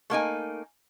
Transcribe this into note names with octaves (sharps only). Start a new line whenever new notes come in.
A3 A#3 D#4 G#5